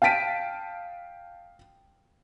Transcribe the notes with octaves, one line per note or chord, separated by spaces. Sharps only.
F5 G5 A5 B6 D7 D#7